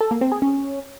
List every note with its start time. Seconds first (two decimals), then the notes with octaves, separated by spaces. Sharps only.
0.01 A4
0.11 A#3
0.21 C4
0.32 G#4
0.42 C#4